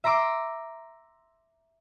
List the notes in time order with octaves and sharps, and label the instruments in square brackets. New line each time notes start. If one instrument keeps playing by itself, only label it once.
[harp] E5 A#5 C6 D6 E6